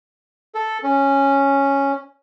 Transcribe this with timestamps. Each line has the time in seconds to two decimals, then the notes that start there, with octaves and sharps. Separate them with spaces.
0.55 A4
0.83 C#4